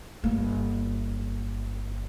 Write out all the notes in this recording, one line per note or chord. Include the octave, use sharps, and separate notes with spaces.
G1 A#3